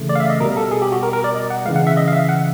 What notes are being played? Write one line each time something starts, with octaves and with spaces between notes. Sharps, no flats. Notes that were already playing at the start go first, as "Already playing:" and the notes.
Already playing: C#3 E3 A3
D5
F5
E5
D#5
B2 G3 A#4
A4
G#4
G4
F#4
A#4
A#4
D5
D#5
F#5
C#3 E3 G#3 F5
F#5
E5
D#5
F5
E5
F#5